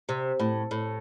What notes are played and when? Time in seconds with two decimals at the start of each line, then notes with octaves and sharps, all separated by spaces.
0.09 C3
0.40 A2
0.71 A2